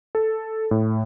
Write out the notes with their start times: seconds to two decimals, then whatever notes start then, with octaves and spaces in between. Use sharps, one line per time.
0.15 A4
0.71 A2